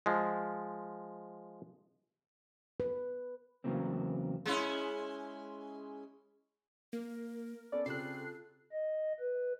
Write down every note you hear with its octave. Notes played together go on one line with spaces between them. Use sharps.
F3 G#3
B4
E2 C#3 F#3 A#3 C4
G#3 C#4 E4
A#3 A#4
B3 C#4 A4 D5
C#3 C4 F4 G4 A4 F#6 C7
D#5
B4